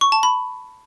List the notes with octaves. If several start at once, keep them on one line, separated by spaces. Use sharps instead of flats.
C#6
A5
B5